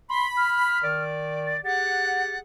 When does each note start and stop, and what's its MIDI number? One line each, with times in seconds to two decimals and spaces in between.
0.09 0.81 83
0.09 0.27 84
0.37 1.03 89
0.83 1.58 51
0.83 1.58 74
1.47 1.61 93
1.65 2.38 67
1.65 2.38 68
1.65 2.38 78
1.65 2.37 93